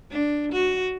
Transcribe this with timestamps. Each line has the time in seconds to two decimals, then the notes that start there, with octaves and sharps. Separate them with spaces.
0.11 D4
0.52 F#4